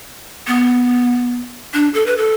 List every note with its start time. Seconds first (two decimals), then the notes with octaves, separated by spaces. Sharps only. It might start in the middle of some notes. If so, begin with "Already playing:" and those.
0.47 B3
1.74 D4
1.94 A4
2.06 B4
2.17 A4